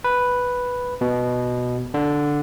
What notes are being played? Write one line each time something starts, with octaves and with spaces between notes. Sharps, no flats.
B4
B2
D3